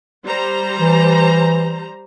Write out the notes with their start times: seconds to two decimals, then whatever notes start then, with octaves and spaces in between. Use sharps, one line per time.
0.24 G3 C5 A#5
0.79 E3